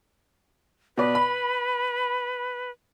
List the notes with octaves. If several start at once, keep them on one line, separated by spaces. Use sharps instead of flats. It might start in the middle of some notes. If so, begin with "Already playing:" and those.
B2 B4 D5
B5